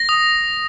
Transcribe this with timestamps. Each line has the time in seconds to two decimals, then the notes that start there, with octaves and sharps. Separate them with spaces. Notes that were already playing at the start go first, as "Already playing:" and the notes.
Already playing: A#6
0.09 D#6